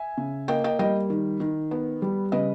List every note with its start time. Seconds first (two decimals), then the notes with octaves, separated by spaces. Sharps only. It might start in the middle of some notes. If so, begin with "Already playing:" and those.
Already playing: E5 G#5
0.17 C#3
0.48 A#3 D#5 G5
0.64 D#5 G5
0.79 G3 D#5 G5
1.10 D#3
1.40 D#3
1.71 B3
2.02 G3
2.32 C#3 B4 D#5